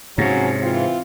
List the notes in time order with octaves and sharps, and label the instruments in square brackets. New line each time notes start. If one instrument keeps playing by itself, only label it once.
[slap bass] G#2 C3 [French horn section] F3 F#3 C#4
[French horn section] E3 C4 F4